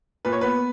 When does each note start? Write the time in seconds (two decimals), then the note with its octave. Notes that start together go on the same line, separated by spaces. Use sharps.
0.25 A#2 B4
0.33 C#5
0.41 B3 B4